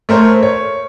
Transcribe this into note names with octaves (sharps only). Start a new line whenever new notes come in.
A3 A#4 C5 C#5
C#5